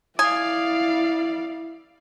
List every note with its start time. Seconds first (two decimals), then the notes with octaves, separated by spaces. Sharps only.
0.19 E4 D5 F5 G#5 D#6